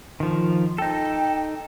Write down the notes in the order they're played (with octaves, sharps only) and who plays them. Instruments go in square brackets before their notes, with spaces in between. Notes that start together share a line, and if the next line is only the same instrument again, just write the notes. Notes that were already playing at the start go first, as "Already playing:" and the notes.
[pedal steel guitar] D#3 F3
[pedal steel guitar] D#4 A4 [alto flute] G5